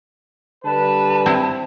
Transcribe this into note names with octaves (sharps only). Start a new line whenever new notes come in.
D3 G3 B4 A5
C4 E4